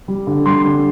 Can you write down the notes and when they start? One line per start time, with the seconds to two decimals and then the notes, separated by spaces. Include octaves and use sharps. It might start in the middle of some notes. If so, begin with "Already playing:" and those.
0.08 G3
0.27 D3
0.46 G3 C6
0.65 D3